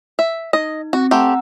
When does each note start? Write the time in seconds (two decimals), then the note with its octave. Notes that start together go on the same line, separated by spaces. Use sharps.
0.19 E5
0.53 D#4 D#5
0.93 C4 F#4
1.11 A3 C4 G4 F#5 A#5 E6